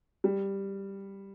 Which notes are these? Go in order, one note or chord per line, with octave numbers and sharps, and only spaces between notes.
G3